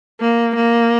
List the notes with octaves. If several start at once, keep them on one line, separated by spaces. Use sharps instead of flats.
A#3
A#3